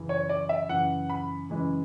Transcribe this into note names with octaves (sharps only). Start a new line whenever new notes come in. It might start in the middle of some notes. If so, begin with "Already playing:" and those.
Already playing: F#2 C#3 E3
C#5
D5
E5
F#2 C#3 E3 F#5
B5
F#2 C#3 E3 G#3